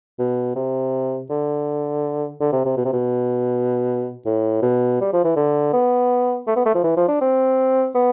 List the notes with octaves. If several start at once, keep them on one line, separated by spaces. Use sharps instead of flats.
B2
C3
D3
D3
C3
C3
B2
C3
B2
A2
B2
G3
F3
E3
D3
B3
A3
B3
A3
F3
E3
F3
D4
C4
B3